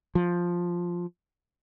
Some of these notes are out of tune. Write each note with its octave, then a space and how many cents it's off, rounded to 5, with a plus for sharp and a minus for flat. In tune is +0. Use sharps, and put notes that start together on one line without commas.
F3 +5